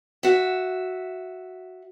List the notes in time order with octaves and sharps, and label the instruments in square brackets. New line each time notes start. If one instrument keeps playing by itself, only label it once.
[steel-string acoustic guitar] F#4 E5